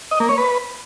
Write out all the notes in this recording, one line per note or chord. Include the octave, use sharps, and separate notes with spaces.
D#5
A#3
C#5
B4